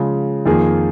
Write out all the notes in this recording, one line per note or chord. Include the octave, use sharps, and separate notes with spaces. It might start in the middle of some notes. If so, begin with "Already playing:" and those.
Already playing: C#3 F3 G#3
F2 D#3 A#3 F4 G#4